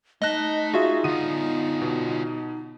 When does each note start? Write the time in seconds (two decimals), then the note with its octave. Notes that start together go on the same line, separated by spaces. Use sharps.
0.22 A3 D#4 D#5 A5 F#6 A#6
0.74 F4 F#4 G#4 E5
1.04 D3 B3 F4 D#7
1.82 B2